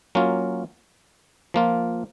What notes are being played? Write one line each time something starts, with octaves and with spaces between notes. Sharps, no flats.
F#3 A#3 C#4 F4
F3 A#3 F4